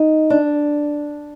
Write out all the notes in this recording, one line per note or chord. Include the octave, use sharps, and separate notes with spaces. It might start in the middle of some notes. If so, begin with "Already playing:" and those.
Already playing: D#4
D4